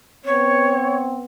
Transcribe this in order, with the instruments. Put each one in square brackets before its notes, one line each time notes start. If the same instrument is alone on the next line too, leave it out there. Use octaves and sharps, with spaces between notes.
[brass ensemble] B3 C4 [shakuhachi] C#5